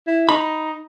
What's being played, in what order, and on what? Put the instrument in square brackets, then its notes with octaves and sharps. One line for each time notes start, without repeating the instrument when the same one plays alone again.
[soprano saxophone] E4
[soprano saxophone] D#4 [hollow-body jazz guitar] B5